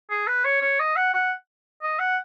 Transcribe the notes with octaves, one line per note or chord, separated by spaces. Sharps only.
G#4
B4
C#5
C#5
D#5
F#5
F#5
D#5
F#5